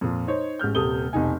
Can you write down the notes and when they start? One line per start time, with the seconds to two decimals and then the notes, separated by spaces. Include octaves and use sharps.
0.01 F2 A#2
0.27 D#4 C5 C#5
0.59 A1 G#3 F6 G6
0.75 D#1 C3 A4 D#6 G7
1.13 F1 B1 D#4 G#5